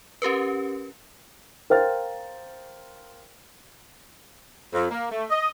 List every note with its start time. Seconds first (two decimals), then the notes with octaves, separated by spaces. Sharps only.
0.22 C#4 G4 A#4 B4
1.70 A#4 C5 F5 G5 F6 A6
4.73 F2
4.91 A#3
5.11 A3
5.30 D#5